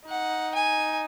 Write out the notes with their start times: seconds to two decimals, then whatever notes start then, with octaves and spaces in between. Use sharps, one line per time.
0.08 D#4 F#5
0.55 G#5